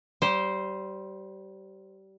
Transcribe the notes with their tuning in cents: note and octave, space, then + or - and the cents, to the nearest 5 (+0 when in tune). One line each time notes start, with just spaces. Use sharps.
G3 -25 C5 +0